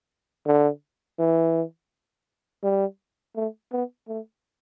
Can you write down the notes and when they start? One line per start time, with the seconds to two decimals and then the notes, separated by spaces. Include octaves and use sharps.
0.47 D3
1.19 E3
2.63 G3
3.36 A3
3.72 B3
4.08 A3